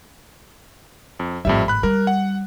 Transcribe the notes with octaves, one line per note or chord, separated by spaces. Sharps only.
F2
G#1 F2 A2 G3 E5
B5 F#6
G3 A#4
F#5